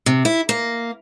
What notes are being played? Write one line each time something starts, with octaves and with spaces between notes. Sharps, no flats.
C3
E4
A#3